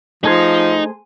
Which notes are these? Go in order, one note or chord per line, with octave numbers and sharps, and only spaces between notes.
F3 A3 D#4 G#4 C5